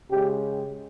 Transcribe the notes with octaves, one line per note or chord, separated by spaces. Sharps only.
C#3 G#3 G4